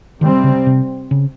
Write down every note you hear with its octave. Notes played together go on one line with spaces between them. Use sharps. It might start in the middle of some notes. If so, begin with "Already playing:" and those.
C3 D#3 G3 C4
C#3
C3
C#3